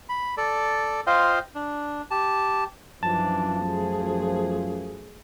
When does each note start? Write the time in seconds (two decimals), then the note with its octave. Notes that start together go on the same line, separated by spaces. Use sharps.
0.09 B5
0.37 A4 D5
1.07 F4 C5 D#5 F5 G5
1.55 D4
2.11 G4 A5
3.03 F#2 E3 F3 D4 A5
3.66 A3 G#4